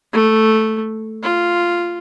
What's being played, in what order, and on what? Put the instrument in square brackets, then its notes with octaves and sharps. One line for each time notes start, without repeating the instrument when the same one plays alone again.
[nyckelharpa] A3
F4